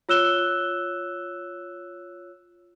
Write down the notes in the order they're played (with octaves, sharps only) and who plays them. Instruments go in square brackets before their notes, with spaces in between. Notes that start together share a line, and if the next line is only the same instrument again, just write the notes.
[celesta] F4 C#5 E6 F#6 E7 G7